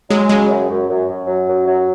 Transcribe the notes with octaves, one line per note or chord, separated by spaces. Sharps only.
F#3 G#3
C#3 G#3
F#2
F#2
F#2
F#2
F#3
F#2
F#3